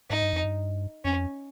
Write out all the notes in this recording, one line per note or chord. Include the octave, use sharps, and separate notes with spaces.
G#2 D#4
G2
F2
G2
F2 C#4